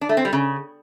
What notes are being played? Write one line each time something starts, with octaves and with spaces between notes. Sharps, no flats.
D4
A3
C4
G3
C#3